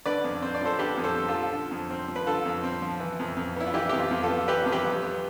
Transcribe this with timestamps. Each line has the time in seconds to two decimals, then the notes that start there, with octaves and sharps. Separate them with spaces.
0.06 D3 B4 D5
0.24 F2
0.42 C4 C5
0.55 D5
0.61 F3 A4 C5
0.79 D3 G4 B4
0.97 F2
1.04 A4 C5
1.17 C4
1.28 F4 A4
1.34 F3
1.53 D3
1.71 F2
1.90 C4
2.08 F3
2.16 B4
2.27 D3 F4 A4
2.45 F2
2.64 C4
2.82 F3
3.00 E3
3.20 F2
3.37 F2
3.56 B3 E4
3.67 F4
3.74 E3 E4 G4
3.89 F2 G4
3.99 F4
4.11 F2
4.23 F4 A4
4.30 B3
4.48 E3 G4 B4
4.66 F2
4.72 G4 B4
4.85 F2
5.03 B3